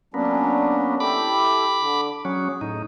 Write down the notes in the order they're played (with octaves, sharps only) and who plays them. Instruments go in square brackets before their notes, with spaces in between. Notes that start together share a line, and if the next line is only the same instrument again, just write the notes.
[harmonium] F#3 C#4 D4 [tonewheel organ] A#3 B3
[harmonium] E4 G4 A4 [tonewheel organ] B5 D6
[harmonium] D3
[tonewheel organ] F#3 C#4 [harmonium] G#4
[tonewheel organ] A2 D#4